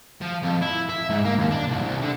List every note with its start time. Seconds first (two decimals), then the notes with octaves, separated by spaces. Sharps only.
0.22 F3
0.43 F2
0.62 E4
0.89 E5
1.10 G#2
1.25 A#3
1.38 D#2
1.51 D4
1.67 C2
1.82 C2
2.02 D3